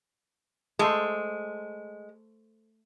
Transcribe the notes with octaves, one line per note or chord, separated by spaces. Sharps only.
G#3 A3 A4 C5